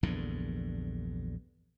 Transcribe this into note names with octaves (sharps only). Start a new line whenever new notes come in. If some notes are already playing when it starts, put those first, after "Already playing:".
A#1 E2 G2 D3